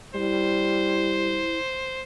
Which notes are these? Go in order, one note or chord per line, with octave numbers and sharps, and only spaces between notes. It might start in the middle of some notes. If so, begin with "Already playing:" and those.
G3 E4 C5